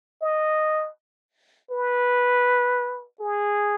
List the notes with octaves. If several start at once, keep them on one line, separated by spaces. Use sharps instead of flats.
D#5
B4
G#4